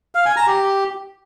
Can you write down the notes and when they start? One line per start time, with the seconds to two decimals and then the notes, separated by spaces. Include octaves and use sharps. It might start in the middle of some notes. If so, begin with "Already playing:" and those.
0.15 F5
0.26 G#5
0.36 A#5
0.47 G4